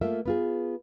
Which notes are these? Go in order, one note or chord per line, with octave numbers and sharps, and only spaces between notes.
A3 A#3 F4 E5
B3 F4 G#4